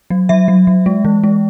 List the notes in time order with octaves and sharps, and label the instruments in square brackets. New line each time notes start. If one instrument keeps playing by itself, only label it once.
[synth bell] F#3
F#3 E5
F#3
F#3
G#3
E3
G#3